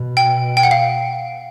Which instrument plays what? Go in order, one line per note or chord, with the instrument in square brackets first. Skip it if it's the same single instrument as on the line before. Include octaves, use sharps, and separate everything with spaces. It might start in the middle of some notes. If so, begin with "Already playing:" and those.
Already playing: [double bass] B2
[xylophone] G5
G5
F#5
F5